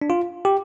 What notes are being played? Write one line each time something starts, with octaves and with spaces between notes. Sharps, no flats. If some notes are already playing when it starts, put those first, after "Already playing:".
D4
F4
G4